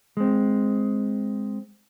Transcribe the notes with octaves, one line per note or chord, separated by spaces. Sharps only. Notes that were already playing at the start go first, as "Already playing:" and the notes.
G#3 C4